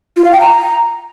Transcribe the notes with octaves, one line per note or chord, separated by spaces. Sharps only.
F4
F5
G5
A#5